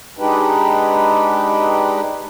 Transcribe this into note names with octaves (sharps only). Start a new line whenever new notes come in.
G#3 D4 D#4 G4 B4